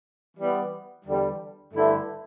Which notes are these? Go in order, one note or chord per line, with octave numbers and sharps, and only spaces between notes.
E3 G3 B3
E2 D3 G3
G2 D3 A3 E4